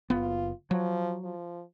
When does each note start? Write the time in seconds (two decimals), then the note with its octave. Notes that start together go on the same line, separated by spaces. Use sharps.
0.10 F#1 B3 F4
0.71 F3 F#3
1.24 F3